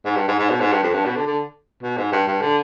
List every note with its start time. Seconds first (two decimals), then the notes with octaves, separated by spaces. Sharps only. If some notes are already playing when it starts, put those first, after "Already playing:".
0.05 G#2
0.16 G2
0.28 G#2
0.39 G#2
0.50 B2
0.60 G#2
0.72 G2
0.83 F2
0.94 G2
1.05 B2
1.17 D3
1.27 D3
1.83 B2
1.97 G#2
2.12 G2
2.27 G2
2.42 D3